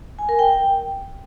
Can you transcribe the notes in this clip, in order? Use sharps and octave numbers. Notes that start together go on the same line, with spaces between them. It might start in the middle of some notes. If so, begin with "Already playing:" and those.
G#5
A#4
G5